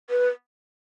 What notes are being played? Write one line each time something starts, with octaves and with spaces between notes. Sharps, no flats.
B4